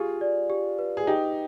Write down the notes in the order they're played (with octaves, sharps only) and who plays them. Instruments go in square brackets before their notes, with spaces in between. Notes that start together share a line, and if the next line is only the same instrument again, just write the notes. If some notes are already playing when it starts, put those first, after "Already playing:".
Already playing: [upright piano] F4 G#4 [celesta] G4
[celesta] D5
G4
B4
[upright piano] G#4
[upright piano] D#4 G4 [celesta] G5